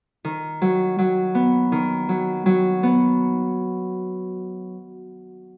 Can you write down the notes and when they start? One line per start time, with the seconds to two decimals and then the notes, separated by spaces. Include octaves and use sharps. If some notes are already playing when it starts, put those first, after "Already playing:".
0.25 D#3
0.62 F#3
0.99 F#3
1.35 B3
1.72 D#3
2.09 F#3
2.46 F#3
2.83 B3